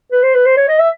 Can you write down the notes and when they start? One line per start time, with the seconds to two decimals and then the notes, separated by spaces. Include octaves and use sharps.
0.12 B4
0.23 C5
0.34 B4
0.46 C5
0.57 C#5
0.68 D#5
0.79 E5